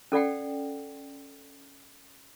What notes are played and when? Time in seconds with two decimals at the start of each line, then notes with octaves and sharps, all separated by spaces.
0.12 C#4 A4 D5 F#5 G5